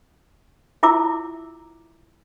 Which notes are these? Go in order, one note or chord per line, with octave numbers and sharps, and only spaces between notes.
E4 F4 E5 A#5 D6 E6